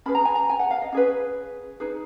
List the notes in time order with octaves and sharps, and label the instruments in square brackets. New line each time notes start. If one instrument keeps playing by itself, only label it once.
[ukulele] C#4 G#4 B4 B5
A#5
G#5
A#5
G#5
F#5
F5
D#5
C#4 G#4 B4
D#4 G#4 B4